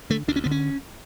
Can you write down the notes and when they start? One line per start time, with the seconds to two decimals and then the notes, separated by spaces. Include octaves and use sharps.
0.10 D3 A3
0.28 D2 D4
0.36 C#4
0.44 D3 B3
0.51 C#4